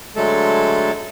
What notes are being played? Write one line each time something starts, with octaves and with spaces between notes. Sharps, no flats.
D3 F#3 G#3 A3 A4